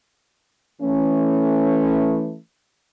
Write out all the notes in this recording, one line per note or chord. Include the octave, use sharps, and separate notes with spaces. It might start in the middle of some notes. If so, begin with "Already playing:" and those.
E3 A3 C#4